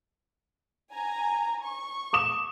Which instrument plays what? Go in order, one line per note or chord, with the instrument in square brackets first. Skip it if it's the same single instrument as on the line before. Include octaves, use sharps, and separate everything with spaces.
[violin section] G#5 A#5
C#6
[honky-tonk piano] D6 D#6 E7